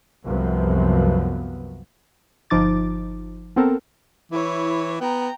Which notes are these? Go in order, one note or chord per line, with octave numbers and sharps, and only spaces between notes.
C2 F#2 C3 F3 F#3 B3
G1 F3 D#4 D6 A6
B3 C4 A4 A#4
E3 E4 C#5
B3 G5 A#5